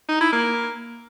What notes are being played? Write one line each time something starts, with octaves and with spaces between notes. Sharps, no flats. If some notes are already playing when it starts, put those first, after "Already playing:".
D#4
E4
A#3